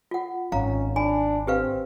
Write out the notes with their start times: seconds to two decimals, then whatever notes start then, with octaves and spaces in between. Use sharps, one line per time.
0.11 F4 F#5
0.52 G#1 C#4 F5 A#5
0.96 D4 G#5 B5
1.47 C4 G4 B4 F5